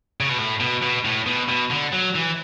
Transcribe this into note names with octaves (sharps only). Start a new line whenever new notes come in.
C#3
B2
A2
B2
B2
A2
B2
B2
D3
F#3
E3